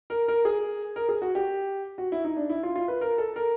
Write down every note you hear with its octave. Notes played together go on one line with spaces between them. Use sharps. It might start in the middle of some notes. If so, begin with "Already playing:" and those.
A#4
A#4
G#4
A#4
G#4
F#4
G4
F#4
E4
D#4
D4
E4
F4
F4
B4
A#4
A4
A#4